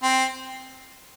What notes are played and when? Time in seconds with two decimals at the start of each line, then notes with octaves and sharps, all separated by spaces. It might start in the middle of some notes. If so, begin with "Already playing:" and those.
0.03 C4